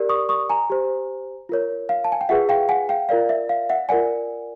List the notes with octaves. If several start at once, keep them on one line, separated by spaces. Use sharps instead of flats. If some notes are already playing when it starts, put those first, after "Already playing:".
Already playing: G4 A#4 D5
C#6 D#6
C#6 D#6
G#5 A#5
G4 C5
F4 A#4 C#5
F5
A5
G#5
G5
F4 G#4 B4 E5 F#5
F5 G5
F#5 G#5
F5 G5
F4 A#4 D5 F5
E5
F5
E5 F#5
F4 A#4 D5 F#5 G#5